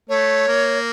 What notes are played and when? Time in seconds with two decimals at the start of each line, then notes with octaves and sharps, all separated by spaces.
0.09 A3 C#5
0.48 A#3